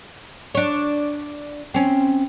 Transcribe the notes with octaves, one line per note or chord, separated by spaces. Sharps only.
D4 C#5
C4 C#4